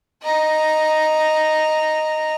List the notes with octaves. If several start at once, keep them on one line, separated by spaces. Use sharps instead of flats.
D#5 A#5